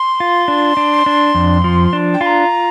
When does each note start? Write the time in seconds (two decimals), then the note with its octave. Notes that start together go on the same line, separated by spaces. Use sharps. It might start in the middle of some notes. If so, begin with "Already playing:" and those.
Already playing: C6
0.20 F4
0.48 D4
0.77 D4
1.06 D4
1.35 F2
1.64 F3
1.93 D4
2.13 G5
2.21 F4 C6
2.25 A#5